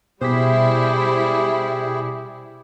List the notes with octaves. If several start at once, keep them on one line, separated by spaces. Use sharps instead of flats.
B2 G3 E4 G4 G#4 C5 B6